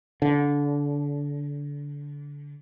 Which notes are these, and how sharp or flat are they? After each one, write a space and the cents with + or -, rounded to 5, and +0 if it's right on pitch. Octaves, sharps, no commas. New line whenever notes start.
D3 -25